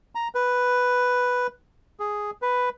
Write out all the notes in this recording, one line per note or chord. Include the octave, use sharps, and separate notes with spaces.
A#5
B4
G#4
B4